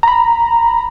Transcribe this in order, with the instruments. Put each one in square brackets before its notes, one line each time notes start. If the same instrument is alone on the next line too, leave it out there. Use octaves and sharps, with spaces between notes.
[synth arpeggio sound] A#5 B5